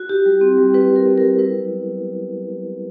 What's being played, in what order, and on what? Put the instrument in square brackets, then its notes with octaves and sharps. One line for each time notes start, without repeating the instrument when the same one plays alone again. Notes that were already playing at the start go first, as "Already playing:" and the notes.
Already playing: [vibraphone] F#4
E4 G4
G3
C4
G3
E4 B4
G3
A#4
C4
A#4
G3
E4 B4
F#3
B3